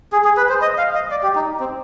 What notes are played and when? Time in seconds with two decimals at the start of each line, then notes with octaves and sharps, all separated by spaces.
0.13 G#4
0.25 G#4
0.37 B4
0.49 C5
0.62 D#5
0.78 F5
0.95 D#5
1.11 D5
1.23 G4
1.35 D#4
1.60 C4